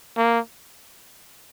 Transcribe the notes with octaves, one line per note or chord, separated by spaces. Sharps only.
A#3